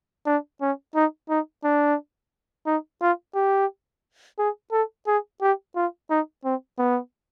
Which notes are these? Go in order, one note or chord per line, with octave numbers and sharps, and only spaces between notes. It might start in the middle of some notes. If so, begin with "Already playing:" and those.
D4
C#4
D#4
D#4
D4
D#4
F4
G4
G#4
A4
G#4
G4
F4
D#4
C4
B3